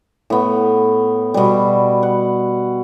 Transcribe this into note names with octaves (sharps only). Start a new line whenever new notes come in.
A2 B3
B2 G3
F#5